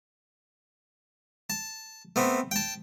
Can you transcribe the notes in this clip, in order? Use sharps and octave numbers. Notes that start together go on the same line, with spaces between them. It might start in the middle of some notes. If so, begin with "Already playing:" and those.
A5
A3 B3 C4
G5 A5